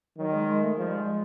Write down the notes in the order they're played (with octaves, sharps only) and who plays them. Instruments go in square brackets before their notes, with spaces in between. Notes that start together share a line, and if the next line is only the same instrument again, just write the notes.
[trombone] D#3 [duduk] F#3
[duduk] G#3
G#3
A3
[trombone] F3 [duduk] G#3
[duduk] G3
G#3